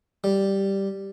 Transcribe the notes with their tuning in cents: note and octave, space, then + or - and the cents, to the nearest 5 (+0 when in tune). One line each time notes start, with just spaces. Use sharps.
G3 +0